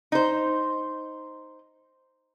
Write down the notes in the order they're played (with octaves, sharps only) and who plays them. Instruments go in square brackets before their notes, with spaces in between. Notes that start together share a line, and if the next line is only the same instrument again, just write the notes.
[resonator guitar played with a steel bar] D#4 C5